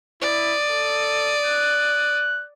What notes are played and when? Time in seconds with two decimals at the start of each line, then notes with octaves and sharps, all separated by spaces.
0.22 E4 D5 D#6
0.71 A4
1.45 F#6